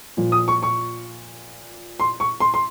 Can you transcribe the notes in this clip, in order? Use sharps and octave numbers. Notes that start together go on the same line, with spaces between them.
A#2 F3
D#6
C#6
C#6
C6
C#6
C6
C6